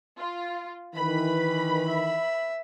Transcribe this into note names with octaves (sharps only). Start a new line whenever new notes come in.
F4
D#3 E3 B4 B5
E5